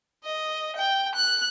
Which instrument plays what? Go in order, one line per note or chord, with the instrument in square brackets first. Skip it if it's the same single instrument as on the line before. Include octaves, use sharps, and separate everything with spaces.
[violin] D#5
G5
F#6